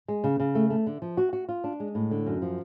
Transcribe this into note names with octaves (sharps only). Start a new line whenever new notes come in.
G#3
C#3
C#3
A3
A3
D3
F3
F#4
F#4
F4
D4
G#3
A2
D3
F#2
F3